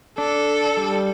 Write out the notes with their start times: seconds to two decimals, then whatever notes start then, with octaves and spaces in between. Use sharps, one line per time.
0.18 D4 A4
0.77 G3